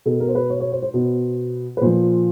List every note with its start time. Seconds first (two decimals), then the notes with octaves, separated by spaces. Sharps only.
0.05 B2 A4
0.20 A#4
0.28 C5
0.35 B4
0.50 C#5
0.60 C#5
0.72 C5
0.82 C5
0.94 B2
1.77 B4
1.81 A#2 F3 C5